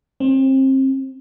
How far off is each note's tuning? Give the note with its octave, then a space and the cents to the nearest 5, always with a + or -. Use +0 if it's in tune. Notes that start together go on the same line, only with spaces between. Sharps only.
C4 +30